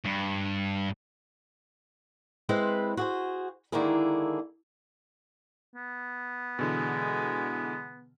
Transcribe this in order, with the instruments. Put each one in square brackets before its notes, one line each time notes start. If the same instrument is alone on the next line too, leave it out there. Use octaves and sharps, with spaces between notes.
[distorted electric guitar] G2
[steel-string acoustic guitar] G#3 C4 E4 B4 C5
F#4 G#4 C5
D3 D#3 G#3 A#3 E4 G#4
[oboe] B3
[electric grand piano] B2 D3 E3 [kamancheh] G#3